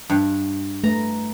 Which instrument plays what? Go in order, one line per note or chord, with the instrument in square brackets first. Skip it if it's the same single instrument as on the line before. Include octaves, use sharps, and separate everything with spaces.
[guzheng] G2
[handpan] A3 B4 [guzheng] A#5